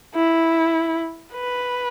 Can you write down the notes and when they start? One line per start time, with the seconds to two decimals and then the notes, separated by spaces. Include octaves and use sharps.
0.15 E4
1.33 B4